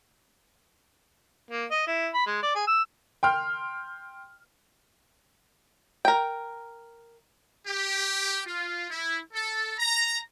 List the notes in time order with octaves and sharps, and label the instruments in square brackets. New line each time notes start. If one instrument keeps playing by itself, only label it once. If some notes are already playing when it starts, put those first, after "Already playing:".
[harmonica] A#3
D#5
E4
B5
G#3
D5
G#4
E6
[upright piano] G5 C6 F6
[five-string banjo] A#4 G5
[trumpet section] G4
F4
E4
A4
A#5